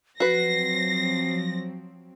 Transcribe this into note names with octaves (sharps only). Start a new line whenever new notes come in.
F3 F#3 C4 F#4 B4 A#6 C7